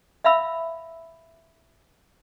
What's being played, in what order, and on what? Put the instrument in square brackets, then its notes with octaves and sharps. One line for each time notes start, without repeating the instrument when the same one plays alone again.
[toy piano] E5 F5 B5 E6